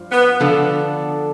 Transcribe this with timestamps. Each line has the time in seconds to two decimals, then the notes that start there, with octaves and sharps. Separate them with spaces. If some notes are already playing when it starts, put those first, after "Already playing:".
Already playing: G2 F3
0.12 B3
0.40 D3 F3 B3 D4 A4